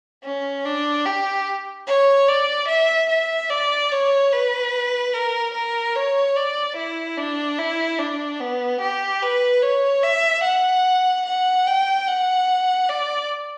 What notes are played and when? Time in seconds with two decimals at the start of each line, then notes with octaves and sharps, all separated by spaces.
0.24 C#4
0.65 D4
1.05 G4
1.87 C#5
2.28 D5
2.68 E5
3.10 E5
3.50 D5
3.91 C#5
4.32 B4
5.14 A#4
5.55 A#4
5.96 C#5
6.36 D5
6.77 E4
7.17 D4
7.59 E4
7.99 D4
8.40 B3
8.81 G4
9.22 B4
9.62 C#5
10.03 E5
10.44 F#5
11.26 F#5
11.67 G5
12.08 F#5
12.89 D5